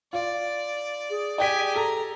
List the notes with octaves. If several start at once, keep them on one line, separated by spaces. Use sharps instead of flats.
F4 D5
G#4
G4 D5 G5 G#5 B6
A4 A#5